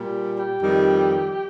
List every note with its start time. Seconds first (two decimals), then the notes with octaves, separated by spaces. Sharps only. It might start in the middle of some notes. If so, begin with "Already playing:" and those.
Already playing: A#2 G3
0.37 G4
0.62 F2 D#3 G3